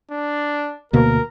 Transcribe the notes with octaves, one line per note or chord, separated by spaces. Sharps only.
D4
D2 B2 A#3 A#4